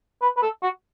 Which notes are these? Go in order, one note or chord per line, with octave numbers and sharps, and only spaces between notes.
B4
B4
A4
F#4